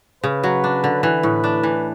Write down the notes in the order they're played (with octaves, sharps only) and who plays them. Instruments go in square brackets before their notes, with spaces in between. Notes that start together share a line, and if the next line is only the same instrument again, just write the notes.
[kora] C#3 [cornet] B4
[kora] F#3
D4
D3
[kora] E3 [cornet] B4
[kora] A2
D4
E3